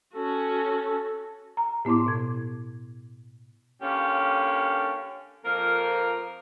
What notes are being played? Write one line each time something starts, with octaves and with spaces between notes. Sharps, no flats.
C#4 F#4 A4
A#5
A2 B3 E4 C6 D6
B2 G#6
D3 A#3 C#4 F4 G4
F2 F3 A#3 A#4